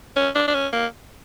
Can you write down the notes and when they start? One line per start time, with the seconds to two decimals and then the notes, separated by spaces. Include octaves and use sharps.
0.17 C#4
0.35 D4
0.48 D4
0.54 C#4
0.73 A#3